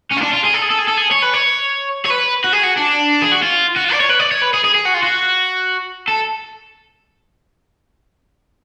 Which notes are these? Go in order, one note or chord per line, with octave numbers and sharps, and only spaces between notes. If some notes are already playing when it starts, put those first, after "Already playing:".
C#4
F4
D4
F4
G#4
A4
G#4
A4
G#4
A4
G#4
C#5
B4
C#5
C#5
B4
F#4
G#4
F#4
D4
G#4
F#4
F4
F#4
F4
D5
C#5
B4
D5
C#5
B4
G#4
G#4
G#4
F#4
F4
F#4
A4